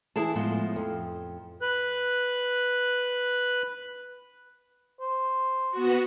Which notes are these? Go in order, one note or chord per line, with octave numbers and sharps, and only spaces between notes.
E3 E4 G#4 A5
A2 F3 G#3 B3
F2
B4 F#6
C5
B3 F#4